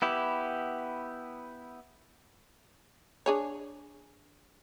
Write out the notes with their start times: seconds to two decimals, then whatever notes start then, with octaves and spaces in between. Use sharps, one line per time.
0.02 B3 E4 G4
3.26 D4 G#4 C#5